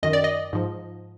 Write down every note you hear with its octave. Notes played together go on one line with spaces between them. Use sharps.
F#2 D#3 D#5
D5
D#5
G#2 F3